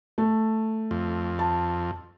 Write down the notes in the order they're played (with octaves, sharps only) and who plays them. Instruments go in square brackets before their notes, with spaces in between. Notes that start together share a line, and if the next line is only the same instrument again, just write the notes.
[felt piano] A3
[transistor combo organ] F2
[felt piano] A5